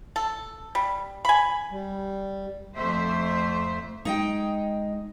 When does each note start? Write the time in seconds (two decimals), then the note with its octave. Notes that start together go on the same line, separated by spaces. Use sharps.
0.16 A4
0.75 G3
1.25 G#5 B5
1.71 G3
2.76 F2 A3 C5 E5
4.05 G#3 D#4 D#5 G5